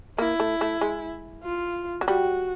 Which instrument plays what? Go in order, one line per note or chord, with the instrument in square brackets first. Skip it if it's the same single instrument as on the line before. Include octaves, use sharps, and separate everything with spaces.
[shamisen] A#3 [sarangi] E4
[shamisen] A3
A3
G#3
[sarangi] F4
[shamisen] F#3
[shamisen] G3 [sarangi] F#4